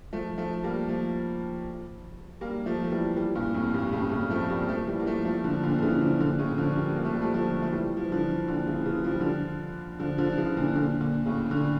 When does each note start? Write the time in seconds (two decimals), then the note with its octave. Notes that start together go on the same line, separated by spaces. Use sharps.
0.13 F3 A3
0.38 F3 A3
0.63 G3 A#3
0.89 F3 A3
2.41 G3 A#3
2.66 F3 A3
2.83 A3
2.91 E3 G3
3.16 E3 G3
3.35 G2 A#2
3.54 F2 A2
3.74 G2 A#2
3.93 A2 C#3
4.11 A2 C#3
4.30 F3 A3
4.50 G3 A#3
4.68 F3 A3
4.87 E3 G3
4.99 A#3
5.06 F3 A3
5.25 F3 A3
5.44 D3 F3
5.63 A#2 D3
5.78 D3
5.82 C#3 E3
6.01 D3 F3
6.20 A#2 D3
6.39 A2 C#3
6.58 D3 F3
6.76 G3 A#3
6.96 A#3
7.05 A3
7.13 G3
7.22 F3 A3
7.34 F3 A3
7.62 A3
7.72 E3 G3
7.97 F3
8.05 E3
8.12 D3 F3
8.48 A#2 D3
8.67 C#3 E3
8.86 C#3 E3
9.04 F3
9.13 G3
9.21 D3 F3
10.00 D3 F3
10.18 D3 F3
10.32 F3
10.37 C#3 E3
10.57 A#2 D3
10.75 A#2 D3
11.01 A#2 D3
11.26 A2 C#3
11.51 A#2 D3